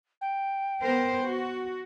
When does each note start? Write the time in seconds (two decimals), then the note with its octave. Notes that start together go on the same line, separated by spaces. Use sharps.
0.21 G5
0.82 B3 A#4 C5
1.23 F#4